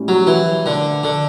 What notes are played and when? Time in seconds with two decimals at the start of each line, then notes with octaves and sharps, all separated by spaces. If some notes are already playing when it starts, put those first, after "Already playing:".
Already playing: A2 G3 C#4 E4 G4
0.08 F#3
0.27 E3
0.66 D3
1.03 D3